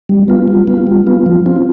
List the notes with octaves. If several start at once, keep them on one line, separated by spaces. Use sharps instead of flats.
G3
B3 F4
G3
B3 F4
G3
B3 F4
F3
C4 F4